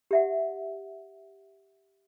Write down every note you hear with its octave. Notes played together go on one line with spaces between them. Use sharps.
G4 E5 F#5